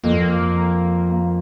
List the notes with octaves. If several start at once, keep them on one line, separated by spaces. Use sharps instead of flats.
F2 A#3